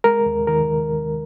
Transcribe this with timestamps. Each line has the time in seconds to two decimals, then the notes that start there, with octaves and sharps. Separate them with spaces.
0.04 G#3 A#4
0.26 D#2
0.47 D#3 A#4